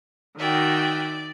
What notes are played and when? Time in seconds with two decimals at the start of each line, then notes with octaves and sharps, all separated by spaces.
0.39 D#3 F#4 D5 E5 G5 D#6